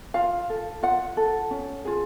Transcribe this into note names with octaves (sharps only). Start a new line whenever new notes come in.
F4 F5
A4
F4 F#5
A4
C#4
F4 G#4